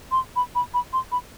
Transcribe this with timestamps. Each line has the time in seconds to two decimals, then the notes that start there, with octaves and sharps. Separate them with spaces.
0.12 C6
0.36 B5
0.55 B5
0.74 B5
0.93 C6
1.12 B5